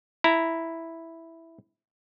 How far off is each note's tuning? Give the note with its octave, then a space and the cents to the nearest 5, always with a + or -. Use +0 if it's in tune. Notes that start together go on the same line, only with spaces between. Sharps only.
E4 +0 A#5 +0